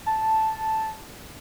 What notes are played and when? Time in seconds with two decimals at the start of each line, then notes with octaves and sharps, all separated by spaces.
0.06 A5